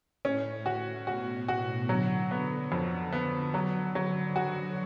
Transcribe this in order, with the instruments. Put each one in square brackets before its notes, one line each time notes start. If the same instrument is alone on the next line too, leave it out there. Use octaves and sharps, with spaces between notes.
[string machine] A2 [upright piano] C#4
[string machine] A2 [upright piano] F#4
[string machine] B2 [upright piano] F#4
[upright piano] F#4
[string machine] D3 [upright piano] F#3
[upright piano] B3
F2
B3
F#3
F#3
[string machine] F#3 [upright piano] F#4